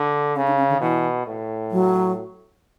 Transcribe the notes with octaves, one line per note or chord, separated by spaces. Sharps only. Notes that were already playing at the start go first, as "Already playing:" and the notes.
Already playing: D3
C#3 C#4
D4
C#4
D3
B2 E3
A2
F#3